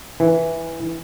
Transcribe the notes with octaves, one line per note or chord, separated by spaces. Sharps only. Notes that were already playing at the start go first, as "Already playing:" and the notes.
E3